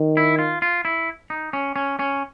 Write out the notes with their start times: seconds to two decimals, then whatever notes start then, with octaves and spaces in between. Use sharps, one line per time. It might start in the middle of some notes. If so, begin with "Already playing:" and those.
Already playing: D#3
0.17 E4
0.39 F4
0.62 F4
0.85 E4
1.30 D#4
1.53 C#4
1.76 C#4
1.99 C#4